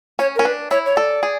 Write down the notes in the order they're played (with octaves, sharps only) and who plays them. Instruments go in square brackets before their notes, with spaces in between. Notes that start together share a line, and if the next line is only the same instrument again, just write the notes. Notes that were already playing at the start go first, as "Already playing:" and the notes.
[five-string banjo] C#4 [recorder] C#5
[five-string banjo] C#4 [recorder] A#4
[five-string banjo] D4 [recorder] B4
[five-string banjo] E4 [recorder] C#5
[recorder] C#5
[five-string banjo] A4 [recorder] D5
[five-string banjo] G#4